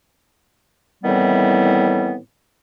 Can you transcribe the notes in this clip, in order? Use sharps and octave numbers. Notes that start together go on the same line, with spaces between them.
A2 D#3 E3 G3 B3 C4